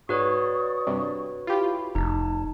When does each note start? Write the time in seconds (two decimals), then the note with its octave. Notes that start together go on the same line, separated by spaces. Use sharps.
0.09 G#2 F#4 B4 C#5 D5 C#6 D#6
0.87 G2 C3
1.47 E4 F4 G4 B5
1.95 F1 D#4 A5